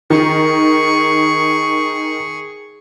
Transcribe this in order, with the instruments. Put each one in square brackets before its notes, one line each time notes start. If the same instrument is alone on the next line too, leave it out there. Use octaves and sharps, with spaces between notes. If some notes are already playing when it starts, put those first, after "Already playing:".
[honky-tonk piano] D#3 [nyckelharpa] G#4 C#6